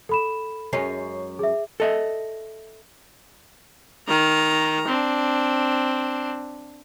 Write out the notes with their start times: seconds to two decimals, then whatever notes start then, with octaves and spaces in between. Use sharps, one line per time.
0.09 A4 B5 E7
0.73 F#2 G#3 C#4 C7
1.39 G#4 E5
1.80 A4 D#5 E5
4.07 D#3 A#5
4.88 C4 D4